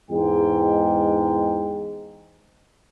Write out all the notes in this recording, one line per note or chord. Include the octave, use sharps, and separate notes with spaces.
E2 G#2 G#3 G5